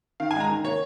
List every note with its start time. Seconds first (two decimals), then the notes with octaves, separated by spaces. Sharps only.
0.20 D#3 F5
0.31 G#5
0.35 G#3
0.40 A#5
0.49 D#3
0.64 A#3 C#5